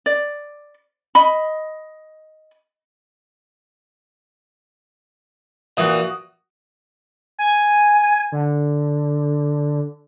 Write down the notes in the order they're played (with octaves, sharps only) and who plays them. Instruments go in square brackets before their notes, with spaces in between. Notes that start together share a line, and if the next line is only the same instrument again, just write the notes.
[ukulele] D5
D#5 B5
[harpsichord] A#2 E3 [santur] F#4 D#6
[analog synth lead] G#5
D3